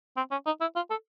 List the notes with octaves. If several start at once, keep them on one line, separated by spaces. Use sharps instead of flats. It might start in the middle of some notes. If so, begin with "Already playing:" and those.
C4
C#4
D#4
E4
F4
A4